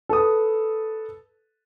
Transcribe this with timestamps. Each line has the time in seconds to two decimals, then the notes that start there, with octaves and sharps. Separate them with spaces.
0.09 A4 B4 D#6